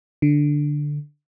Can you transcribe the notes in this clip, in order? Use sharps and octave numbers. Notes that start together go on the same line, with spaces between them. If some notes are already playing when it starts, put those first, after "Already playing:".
D3